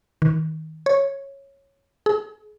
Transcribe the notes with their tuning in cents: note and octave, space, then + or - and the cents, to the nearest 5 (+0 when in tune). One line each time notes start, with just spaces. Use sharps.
D#3 +25
C#5 -10
G#4 +35